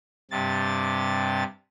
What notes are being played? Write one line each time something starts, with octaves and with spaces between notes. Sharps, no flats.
G2 C3 A6